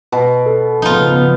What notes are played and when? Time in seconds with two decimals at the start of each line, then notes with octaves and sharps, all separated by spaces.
0.12 B2
0.46 A4
0.82 C#3 F3 B3 D#4 F4